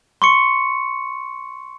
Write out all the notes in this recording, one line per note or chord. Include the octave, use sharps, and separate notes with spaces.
C6 C#6 C#7